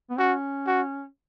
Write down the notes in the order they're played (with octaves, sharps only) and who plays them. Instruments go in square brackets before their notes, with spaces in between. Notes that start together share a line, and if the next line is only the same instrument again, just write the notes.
[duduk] B3
[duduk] C#4 [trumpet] F#4
[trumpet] F#4